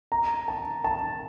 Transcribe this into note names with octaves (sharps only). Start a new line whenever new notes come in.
A#5
A5
A5